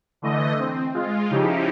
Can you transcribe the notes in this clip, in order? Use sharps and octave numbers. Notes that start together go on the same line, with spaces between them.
D3 E3 A3 D#5
C4
G#3 F4
C#3 F3 D#4 E4 G4